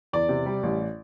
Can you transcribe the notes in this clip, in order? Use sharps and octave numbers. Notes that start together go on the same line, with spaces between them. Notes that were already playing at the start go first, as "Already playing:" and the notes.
E2 D5
C3
G3
A1